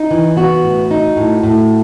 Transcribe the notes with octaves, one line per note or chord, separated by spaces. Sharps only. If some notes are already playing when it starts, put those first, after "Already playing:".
Already playing: D#4
E3
B3 F#4
A2
D#4
A2
A2